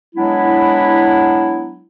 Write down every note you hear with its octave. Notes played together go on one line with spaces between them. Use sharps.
F#3 G#3 B3 D4 E4